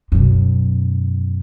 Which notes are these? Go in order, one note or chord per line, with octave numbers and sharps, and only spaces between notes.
F#2 B2